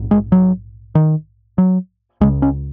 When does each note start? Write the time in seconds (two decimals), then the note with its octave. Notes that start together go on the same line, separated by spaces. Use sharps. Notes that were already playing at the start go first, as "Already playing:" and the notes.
Already playing: A#1 G#2
0.11 G#3
0.32 F#3
0.95 D#3
1.58 F#3
2.21 C#2 C#3 G#3
2.42 C#4